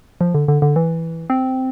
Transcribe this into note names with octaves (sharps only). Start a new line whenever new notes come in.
F3
D3
D3
D3
E3
C4